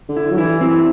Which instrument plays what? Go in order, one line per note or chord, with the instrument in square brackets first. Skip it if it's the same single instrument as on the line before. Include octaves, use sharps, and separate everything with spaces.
[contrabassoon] D3
[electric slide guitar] E4
[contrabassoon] F#3
[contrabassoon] E3 [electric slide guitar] E4
[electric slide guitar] C4